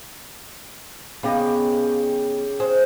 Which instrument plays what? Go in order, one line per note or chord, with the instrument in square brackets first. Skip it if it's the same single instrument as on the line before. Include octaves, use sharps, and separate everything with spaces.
[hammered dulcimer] C#3 G4 [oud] B3 D#4
[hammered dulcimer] G#4 [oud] C5